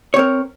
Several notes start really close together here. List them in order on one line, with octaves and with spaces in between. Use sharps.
C#5 C4 A#4